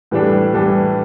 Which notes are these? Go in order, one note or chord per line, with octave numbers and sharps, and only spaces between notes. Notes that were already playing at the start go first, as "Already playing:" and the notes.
A2 E3 G3 D4 A4
A2 E3 G3 D4 A4